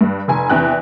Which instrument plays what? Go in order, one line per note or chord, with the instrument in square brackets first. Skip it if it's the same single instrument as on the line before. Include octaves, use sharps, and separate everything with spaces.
[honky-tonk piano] G2
F1 G#5
E2 C3 D4 G5 F#6